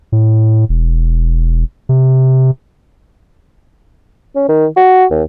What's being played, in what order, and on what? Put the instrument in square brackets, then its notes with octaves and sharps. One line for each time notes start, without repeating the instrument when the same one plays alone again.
[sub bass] A2
E1
C3
[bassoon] C#4
D#3
F#4
D#2